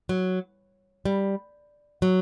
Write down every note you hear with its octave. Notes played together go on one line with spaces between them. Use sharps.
F#3
G3
F#3